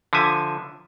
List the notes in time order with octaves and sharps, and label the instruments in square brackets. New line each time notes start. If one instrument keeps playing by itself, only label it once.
[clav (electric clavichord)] D3 F3 E5 G#5